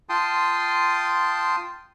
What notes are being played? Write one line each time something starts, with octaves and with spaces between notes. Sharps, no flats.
F4 G5 A5 C6 D#6